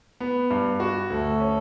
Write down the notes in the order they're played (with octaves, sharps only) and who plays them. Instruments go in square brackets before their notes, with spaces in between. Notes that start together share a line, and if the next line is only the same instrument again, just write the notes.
[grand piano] B3
G2
F#4
[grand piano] D2 [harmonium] A3 A4
[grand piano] C#4